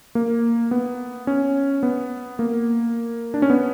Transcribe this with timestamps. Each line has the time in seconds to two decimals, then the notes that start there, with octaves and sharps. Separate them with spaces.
0.15 A#3
0.71 B3
1.27 C#4
1.83 B3
2.39 A#3
3.34 D4
3.42 C#4
3.50 B3